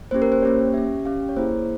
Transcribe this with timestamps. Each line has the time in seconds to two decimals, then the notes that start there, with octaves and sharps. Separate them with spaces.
0.11 A#3 C#4 G4 C5
0.22 A#4
0.32 C5
0.42 A#3 C#4 G4 C#5
0.74 C#4 G4 E5
1.05 C#4 G4 F5
1.29 C#5
1.36 A#3 E4 G#4 C5